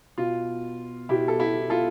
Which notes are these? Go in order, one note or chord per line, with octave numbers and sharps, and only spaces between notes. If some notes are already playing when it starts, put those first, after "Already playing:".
B2 F4
B2 E4 G4
A4
E4 G4
F4 A4